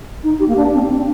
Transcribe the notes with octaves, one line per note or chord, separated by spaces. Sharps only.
D#4
G4
A#3
D4
C4
D4